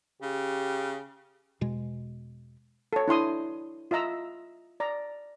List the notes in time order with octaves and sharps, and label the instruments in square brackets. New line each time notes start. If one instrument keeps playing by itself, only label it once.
[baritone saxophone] C#3 [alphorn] G4
[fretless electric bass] E2 B2 G#3
[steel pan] A4 C#5
D4 E4 C6 D#6
F4 D#5 E5 A#5 E6
D5 A#5